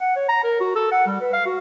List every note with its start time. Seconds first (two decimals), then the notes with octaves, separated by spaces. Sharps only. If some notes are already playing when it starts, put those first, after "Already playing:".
0.01 F#5
0.16 C#5
0.29 A#5
0.44 A#4
0.61 F#4
0.76 A4
0.92 F#5
1.07 G3
1.21 B4
1.33 F5
1.46 F#4